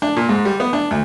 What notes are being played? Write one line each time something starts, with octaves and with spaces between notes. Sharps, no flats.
D4
A#2
G#2
G3
B3
D4
D2